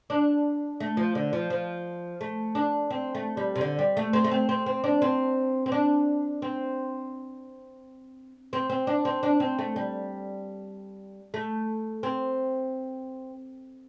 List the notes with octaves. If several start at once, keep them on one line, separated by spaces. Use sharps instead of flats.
D4
A3
F3
D3
F3
F3
A3
D4
C4
A3
G3
C3
D3
G3
A3
C4
A3
C4
C4
C4
D4
C4
C4
D4
C4
C4
C4
D4
C4
D4
C4
A3
G3
A3
C4